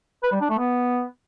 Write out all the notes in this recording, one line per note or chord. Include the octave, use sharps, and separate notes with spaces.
B4
G3
D4
A3
B3